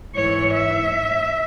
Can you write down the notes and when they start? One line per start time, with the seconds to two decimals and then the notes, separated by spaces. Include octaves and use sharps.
0.14 G#2 E3 C#5
0.53 E5